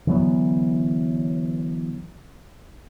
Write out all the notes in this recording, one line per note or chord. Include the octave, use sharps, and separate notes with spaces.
D3 E3 F#3 B3